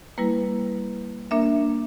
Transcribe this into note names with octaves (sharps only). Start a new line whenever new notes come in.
G3 A#3 E4 B4
A#3 D4 A#4 E5